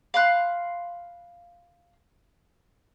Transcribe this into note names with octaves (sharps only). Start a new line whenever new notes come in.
F5 B5 C6 F#6